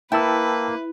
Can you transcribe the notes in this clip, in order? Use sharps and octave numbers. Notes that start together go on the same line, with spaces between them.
A#3 E4 B4 G5 A5 E6